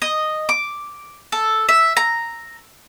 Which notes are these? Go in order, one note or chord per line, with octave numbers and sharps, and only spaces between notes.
D#5
D6
A4
E5
A#5